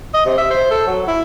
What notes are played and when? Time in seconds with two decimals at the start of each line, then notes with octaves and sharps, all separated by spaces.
0.14 D#5
0.25 C3
0.38 E5
0.51 C5
0.71 A4
0.87 F#3
1.07 E4